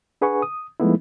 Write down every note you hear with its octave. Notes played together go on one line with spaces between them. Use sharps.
D4 G#4 B4 F#5 G#5 C#6
D#6
F3 G#3 A3 B3 D#4 E4